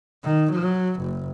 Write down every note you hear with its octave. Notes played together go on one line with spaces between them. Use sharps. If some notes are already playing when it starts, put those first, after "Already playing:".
D#3
F#3
F#1